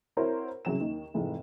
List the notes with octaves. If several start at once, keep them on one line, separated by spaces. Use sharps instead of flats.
C4 E4 F#4 A#4 C5 C#5
C2 C#3 F#3 C#4 E7
D#2 D#3
F1 G#2 E3